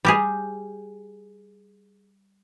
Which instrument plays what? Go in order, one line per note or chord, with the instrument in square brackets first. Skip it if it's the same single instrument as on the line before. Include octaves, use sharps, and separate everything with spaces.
[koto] G3 G4 G#4